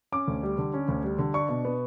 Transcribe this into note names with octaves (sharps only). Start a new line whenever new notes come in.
C#4 D6
D2
G3
D3
C#4
D2
G3
D3
D4 C#6
B2
B3